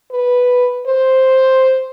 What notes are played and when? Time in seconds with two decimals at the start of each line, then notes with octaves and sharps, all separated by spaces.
0.12 B4
0.87 C5